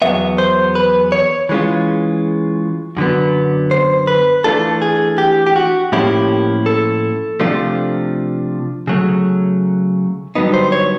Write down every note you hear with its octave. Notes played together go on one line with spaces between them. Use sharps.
E2 B2 F#3 B3 E5
C5
B4
C#5
E3 G#3 C#4 F4
F#2 D3 F#3 B3
C5
B4
E3 A3 D4 F4 A4
G#4
G4
G4
F#4
A2 F3 A#3 C#4 E4 G4
A4
C3 F3 A3 D4 F4
C#3 F#3 A3
G2 D3 F#3 B3 D#4
C5
C#5